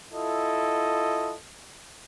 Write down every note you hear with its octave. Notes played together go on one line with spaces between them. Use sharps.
E4 F4 A4 D#5